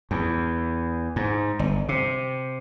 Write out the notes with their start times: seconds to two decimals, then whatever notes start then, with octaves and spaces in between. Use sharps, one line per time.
0.11 E2
1.16 G#2
1.59 G1
1.89 C3